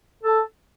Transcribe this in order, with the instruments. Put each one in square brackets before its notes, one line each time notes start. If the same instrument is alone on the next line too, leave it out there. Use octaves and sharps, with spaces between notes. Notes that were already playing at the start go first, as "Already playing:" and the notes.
[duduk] A4